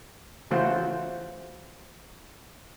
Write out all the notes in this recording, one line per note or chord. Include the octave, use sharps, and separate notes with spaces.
C#3 E3 A3 F4 F#4 C5